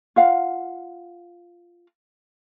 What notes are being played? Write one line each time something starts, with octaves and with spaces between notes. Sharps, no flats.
F4 F5 F#5